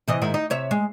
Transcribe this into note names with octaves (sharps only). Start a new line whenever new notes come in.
C3 E3 D#5
G#2 D#3 E4
D#4
C3 C#5 E5
G#3